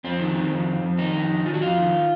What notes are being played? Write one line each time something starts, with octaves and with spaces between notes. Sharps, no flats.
F2 C4
D#3
D#3
F2
F2
F2
D#3 D#4
F2
D#3
D#3 F4
F#4
F2 F4
D#3